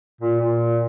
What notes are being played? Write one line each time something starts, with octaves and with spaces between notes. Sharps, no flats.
A#2
A#2